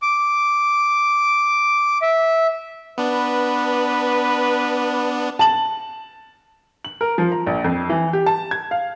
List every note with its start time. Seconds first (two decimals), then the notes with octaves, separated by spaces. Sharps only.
0.02 D6
2.02 E5
2.98 B3 D4 B4
5.39 A5 F#7
6.85 F#7
7.01 A#4
7.18 F3
7.32 A#5
7.47 A#1
7.64 F2
7.89 E3
8.13 G4
8.26 A5
8.51 G#6
8.71 F5